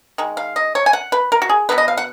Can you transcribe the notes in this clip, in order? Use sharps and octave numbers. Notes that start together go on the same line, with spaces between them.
D#3 G#3
F5
D#5
C#5
G#5
F#5
B4
A#4
F#4
G#4
B2 G#3 B3 B4
D#5
F5
F#5